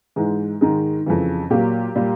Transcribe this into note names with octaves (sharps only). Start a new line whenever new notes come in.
G#2 E3 G#3
G#2 D#3 G#3
F2 C#3 E3
A#2 F#3 A#3 G4
A#2 G3 A#3